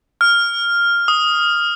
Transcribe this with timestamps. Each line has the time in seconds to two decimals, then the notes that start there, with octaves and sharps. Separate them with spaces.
0.21 F6
1.08 D#6